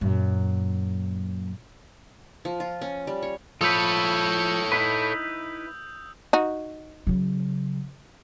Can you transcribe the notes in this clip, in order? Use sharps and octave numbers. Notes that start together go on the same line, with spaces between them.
F#2 A#2
F3
F4
C#4
G3
C#5
F3 A4 B4 C#5 D#6 E6 G6
D#4 E4 B4
D#4 F#4
C#3 F#3